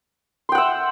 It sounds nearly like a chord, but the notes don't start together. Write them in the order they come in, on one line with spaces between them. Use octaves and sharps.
C6 G5 F#5 E5